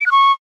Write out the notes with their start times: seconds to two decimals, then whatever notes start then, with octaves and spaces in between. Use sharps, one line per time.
0.01 D7
0.06 F#6
0.12 C#6